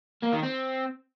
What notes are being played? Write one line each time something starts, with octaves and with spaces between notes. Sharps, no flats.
A#3
D#3
C4